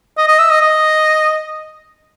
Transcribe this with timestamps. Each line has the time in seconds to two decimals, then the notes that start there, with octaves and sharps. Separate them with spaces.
0.18 D#5
0.28 D#5
0.39 E5
0.50 D#5
0.61 D#5